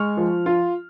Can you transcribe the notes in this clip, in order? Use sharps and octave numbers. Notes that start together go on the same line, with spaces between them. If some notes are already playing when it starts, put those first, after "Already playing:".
Already playing: G#3 C#6 F6
F3
F4